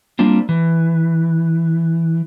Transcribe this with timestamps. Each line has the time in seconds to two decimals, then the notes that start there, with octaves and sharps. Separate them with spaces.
0.19 G3 A#3 C4 D4 F4
0.49 E3